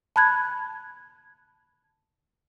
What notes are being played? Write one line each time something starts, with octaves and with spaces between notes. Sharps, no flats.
A5 B5 F#6 G#6